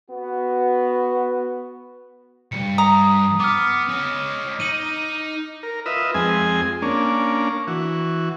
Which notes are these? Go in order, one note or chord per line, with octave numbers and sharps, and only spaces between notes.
B3 F#4
C2 G2 C#7
A#5 D#6
B3 D6 F6
C#4 D#5
D#4 D#7 F#7
A#4
F4 B4 D#5 E5
F2 G#3 C4 G#4 G#5
A#3 C#4 D4
E3 F#4